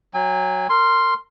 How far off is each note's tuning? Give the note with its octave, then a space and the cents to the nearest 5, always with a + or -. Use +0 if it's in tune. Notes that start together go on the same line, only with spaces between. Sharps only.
F#3 +0 G#5 -40
A#4 -25 C6 +0